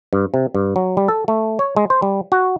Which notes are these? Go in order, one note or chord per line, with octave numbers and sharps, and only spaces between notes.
G2
C3
G2
F#3
G3
A4
A3
C#5
G#3
C5
G3
F#4